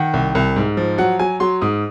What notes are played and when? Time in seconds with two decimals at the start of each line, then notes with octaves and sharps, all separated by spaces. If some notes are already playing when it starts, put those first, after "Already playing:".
Already playing: D#3 F#5
0.14 C2
0.35 C2
0.56 G#2
0.77 F3
0.98 F#3 F#5
1.19 F#3 G#5
1.40 F#3 C6
1.62 G#2 D#6